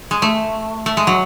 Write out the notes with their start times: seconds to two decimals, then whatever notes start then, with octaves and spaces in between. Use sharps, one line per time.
0.11 G#3
0.22 A3
0.86 A3
0.97 G#3
1.07 F#3